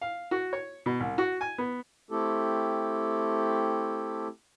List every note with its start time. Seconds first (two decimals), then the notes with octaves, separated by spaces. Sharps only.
0.01 F5
0.31 F#4
0.53 C#5
0.86 B2
1.00 C2
1.18 F#4
1.41 G#5
1.58 B3
2.11 A3 C4 E4 G4 A4